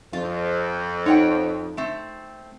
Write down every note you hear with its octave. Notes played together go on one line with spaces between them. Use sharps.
F2 F4
D#4 C#5 F#5 G5
A3 C4